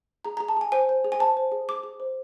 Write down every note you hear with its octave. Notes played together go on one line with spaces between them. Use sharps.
G#4 A#5
A#5
G#4
A5
G#4 G#5
C5 G#5
C5
G#4
G#5
C5 A5
C5
G#4
G#4 D6
G#4
C5